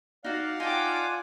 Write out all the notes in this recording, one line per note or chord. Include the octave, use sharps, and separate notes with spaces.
D#4 F#4 D5 F5 F#5
D#4 F4 A4 G5 G#5 D6